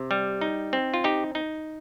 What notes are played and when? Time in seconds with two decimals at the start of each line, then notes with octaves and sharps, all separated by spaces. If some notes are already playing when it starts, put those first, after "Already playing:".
Already playing: C3
0.11 G3
0.41 D#4
0.73 C4
0.94 F4
1.04 D#4 G4
1.35 D#4